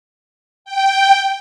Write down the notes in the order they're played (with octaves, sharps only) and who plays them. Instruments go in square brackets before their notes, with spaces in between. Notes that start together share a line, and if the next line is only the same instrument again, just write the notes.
[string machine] G5